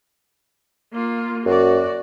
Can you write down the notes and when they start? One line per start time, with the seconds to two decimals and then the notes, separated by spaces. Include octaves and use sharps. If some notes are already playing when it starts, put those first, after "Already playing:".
0.93 A#3 F4
1.46 F#2 F#4 D5